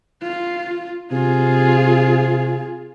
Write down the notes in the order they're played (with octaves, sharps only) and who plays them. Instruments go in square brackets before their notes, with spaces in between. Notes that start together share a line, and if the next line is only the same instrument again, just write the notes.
[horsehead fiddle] F4
[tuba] C3 [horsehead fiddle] F4 G#4